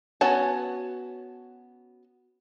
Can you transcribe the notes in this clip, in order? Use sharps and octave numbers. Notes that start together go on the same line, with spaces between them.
B3 C#4 F#4 C#5 A5